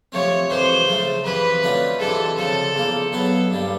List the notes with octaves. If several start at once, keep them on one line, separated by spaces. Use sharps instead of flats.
C3 F3 A3 C4 C#5
F2 C3 E3 G#3 C5
C#3 F3 A3
F2 C3 E3 B4
D3 F3 A3 C#4 F#4
D2 C3 E3 G#3 A4
D2 C#3 F3 A4
E2 C#3 F3 A#3
B2 F#3 B3 E4 A4
G2 D3 G3 A#3